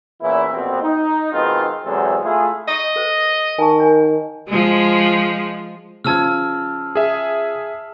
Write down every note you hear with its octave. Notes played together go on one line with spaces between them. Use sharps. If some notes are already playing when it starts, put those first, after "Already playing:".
E2 A#2 E3 C#4 E4
A#1 F2 B2 B3 C4
D#4
B2 D#3 G#3 B3 C4 F4
E2 C3 F#3 G#3 C4 A4
A3 E4 F4 G#4
D#5 C#6
A4 B4 C5
D#3 G#5 A5 C#6
A#4 C#5 G#5
F3 G#3
C#3 F3 A5 E6 F6 G#6
G#4 E5